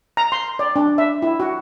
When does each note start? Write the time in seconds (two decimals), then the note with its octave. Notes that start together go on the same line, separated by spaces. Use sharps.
0.17 A#5
0.32 C6
0.59 D5
0.76 D4
0.98 E5
1.22 E4
1.40 F#4